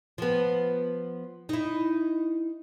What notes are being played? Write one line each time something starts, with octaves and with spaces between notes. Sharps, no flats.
F3 B3
D#4 E4